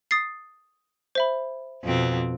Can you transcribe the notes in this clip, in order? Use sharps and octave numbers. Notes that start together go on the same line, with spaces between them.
D#6 A6 C7
C5 E5 B5
F2 B2 C4